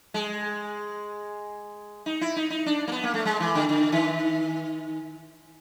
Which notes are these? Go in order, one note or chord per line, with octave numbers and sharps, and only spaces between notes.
G#3
D#4
E4
D#4
D#4
D4
A#3
B3
A#3
A3
G#3
E3
D3
D3
D#3